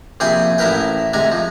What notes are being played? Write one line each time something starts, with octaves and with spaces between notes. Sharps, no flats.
A#1 C3 G#4 G5 G#5 B5
A1 E4 A#4 B4 G5
D2 C3 G#3 G#5 A#5
F3